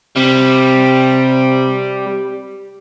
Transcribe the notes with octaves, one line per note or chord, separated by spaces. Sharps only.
C3 G3